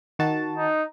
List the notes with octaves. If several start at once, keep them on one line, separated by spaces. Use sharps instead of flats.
D#3 F#4 A5
D#4